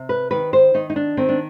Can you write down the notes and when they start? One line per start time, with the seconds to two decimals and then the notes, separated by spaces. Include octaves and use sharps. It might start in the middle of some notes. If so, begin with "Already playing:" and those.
Already playing: C3
0.09 B4
0.31 D#3 B4
0.53 C5
0.74 D#3 D#4
0.90 D#4
0.96 D4
1.17 D#3 C4
1.29 D4